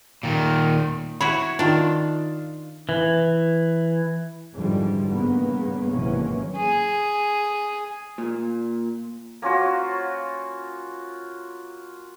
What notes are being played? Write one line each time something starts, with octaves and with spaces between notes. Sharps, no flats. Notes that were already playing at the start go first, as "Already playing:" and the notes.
A#2 D#3
E4 F#4 C#5 B5
D#3 D4 F4
E3
F2 G#2 D3 E3 F3 G3
G2 C#3 A#3 B3
G#1 C3 E3 F#3 A#3 C#4
G#4
A#2
A#3 C#4 F4 F#4